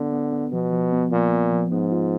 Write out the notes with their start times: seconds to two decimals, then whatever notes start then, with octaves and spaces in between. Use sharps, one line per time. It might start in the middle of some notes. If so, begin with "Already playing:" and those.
Already playing: D3 B3
0.13 B3
0.33 B3
0.53 B2 F3
0.72 F3
0.93 B3
1.12 A#2 F3
1.32 B3
1.52 F3
1.72 G#2 B3
1.92 F4